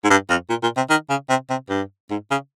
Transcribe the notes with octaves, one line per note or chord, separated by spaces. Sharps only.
G#2
G2
F2
A#2
A#2
C3
D#3
C#3
C3
C3
G2
G#2
C#3